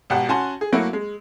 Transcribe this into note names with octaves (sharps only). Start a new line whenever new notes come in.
G#1 B2 G4 F#5
C#4 F#4 F#5 G#5 A5 C6
G#4
F#3 A3 A#3 E4 F#4
G#3